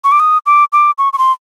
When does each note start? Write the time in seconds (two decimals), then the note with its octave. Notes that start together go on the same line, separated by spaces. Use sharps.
0.04 C#6
0.12 D6
0.20 D#6
0.46 D6
0.73 D6
0.98 C#6
1.13 C#6
1.18 C6